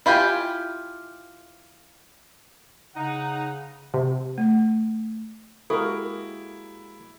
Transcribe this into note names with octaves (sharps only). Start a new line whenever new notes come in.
E4 F4 G4 G5 G#5
C#3 D#4 F#5
C3
A3
G#3 A#3 E4 F#4 G4 A4 A#4